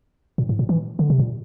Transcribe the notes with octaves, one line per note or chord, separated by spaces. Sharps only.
A#2
A2
A#2
E3
D3
C3
A#2